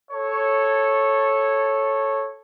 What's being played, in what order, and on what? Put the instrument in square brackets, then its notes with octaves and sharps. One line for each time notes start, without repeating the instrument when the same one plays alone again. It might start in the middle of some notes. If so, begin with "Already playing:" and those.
[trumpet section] A4 C#5